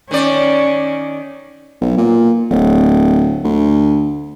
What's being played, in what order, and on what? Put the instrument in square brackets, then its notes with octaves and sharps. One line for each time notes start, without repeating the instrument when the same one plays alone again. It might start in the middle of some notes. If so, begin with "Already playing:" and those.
[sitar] D#3 D5 [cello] C#4
[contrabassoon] B1
A#2
D1
D2